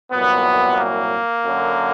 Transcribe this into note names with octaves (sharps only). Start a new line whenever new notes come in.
C2 A#2 F#3 B3
A#3
F#2 D3 F#3